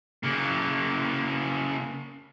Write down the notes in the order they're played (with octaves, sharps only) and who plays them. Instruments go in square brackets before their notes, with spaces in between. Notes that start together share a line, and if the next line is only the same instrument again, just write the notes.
[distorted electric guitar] C#3 A#3